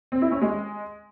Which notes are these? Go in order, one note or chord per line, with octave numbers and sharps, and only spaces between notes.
C4
E4
C#4
G#3